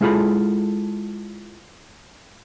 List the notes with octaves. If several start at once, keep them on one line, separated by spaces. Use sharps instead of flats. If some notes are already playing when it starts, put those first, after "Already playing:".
G#3 E4 F4 G#4 A4 B5